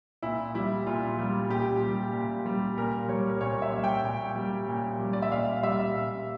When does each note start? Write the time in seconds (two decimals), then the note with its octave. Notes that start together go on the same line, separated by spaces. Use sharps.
0.23 A#2 E4
0.54 G3 E4
0.87 A#2 F4
1.18 G3
1.50 A#2 G4
1.82 G3
2.13 A#2
2.46 G3
2.77 A#2 A#4
3.08 G3 C#5
3.29 A#4
3.41 A#2 C#5
3.62 E5
3.73 G3
3.84 G5
4.04 A#2
4.36 G3
4.68 A#2
4.99 G3
5.13 D5
5.22 E5
5.32 A#2 F5
5.63 G3 E5
5.95 A#2